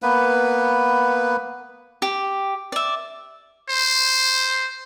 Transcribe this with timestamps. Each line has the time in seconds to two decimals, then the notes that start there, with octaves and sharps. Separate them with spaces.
0.02 A#3 B3 B4
2.02 G4
2.72 D5 E5
3.70 C5